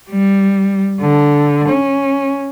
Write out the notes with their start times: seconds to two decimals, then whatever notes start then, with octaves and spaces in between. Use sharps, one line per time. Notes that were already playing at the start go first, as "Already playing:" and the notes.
0.11 G3
1.01 D3
1.69 C#4